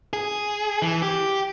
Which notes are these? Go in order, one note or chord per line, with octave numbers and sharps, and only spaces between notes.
G#4
E3
G4